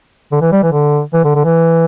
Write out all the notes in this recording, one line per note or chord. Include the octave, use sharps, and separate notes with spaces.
D3
E3
G3
E3
D3
E3
D3
D3
E3